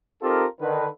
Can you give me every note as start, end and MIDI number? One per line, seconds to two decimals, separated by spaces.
0.21 0.45 60
0.21 0.45 63
0.21 0.45 65
0.21 0.45 67
0.21 0.45 69
0.21 0.45 70
0.60 0.86 50
0.60 0.86 51
0.60 0.86 71